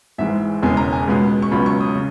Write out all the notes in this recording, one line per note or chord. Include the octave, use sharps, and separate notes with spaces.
G#1 G#2 E3 G#3 E5
E1 E2 C#3 G#3 B3 G#5
A#5
G#5
C#2 B2 G#3 B3
C#6
C#2 C#3 F#3 B3 B5
C#6
D#6
C#3